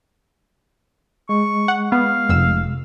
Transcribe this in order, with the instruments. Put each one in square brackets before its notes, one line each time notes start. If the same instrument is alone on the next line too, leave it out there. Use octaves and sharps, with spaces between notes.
[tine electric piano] G#3 [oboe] C#6
[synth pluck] F#5
[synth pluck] B3 [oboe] F5
[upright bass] F1 [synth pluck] F2 E6